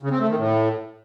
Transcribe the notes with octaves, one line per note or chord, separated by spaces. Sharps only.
C#3
C4
A3
D#3
A2